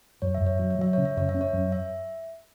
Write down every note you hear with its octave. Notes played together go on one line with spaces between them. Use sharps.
F#2 C#5
E5
F#2
C#5
F#3 E5
C#5
F#3 E5
C#3 C#5
E5
F#2 C#5
E5
C#4
C#5
F#2
E5